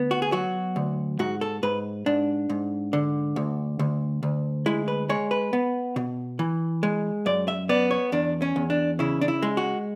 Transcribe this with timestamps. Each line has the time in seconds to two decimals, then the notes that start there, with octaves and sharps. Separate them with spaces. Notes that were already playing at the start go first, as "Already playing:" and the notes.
Already playing: D2 B3
0.11 F#4
0.22 G#4
0.32 F#3 F#4
0.76 D2
1.19 G#2 F#4
1.41 A4
1.63 G#2 B4
2.06 G#2 D4
2.50 G#2
2.93 D3
3.36 D2
3.79 D2
4.23 D2
4.66 G#3 E4
4.88 B4
5.09 G#3 C#5
5.31 B4
5.53 B3
5.96 B2
6.39 E3
6.83 G#3
7.26 F#2 D5
7.48 E5
7.69 B3 D5
7.91 C#5
8.12 E2 D4
8.42 C#4
8.56 E2
8.70 D4
8.99 C#3 E4
9.21 D4
9.28 E4
9.42 G#3
9.57 F#4